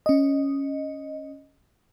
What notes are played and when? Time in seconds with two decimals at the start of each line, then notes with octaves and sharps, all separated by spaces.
0.06 C#4 D#5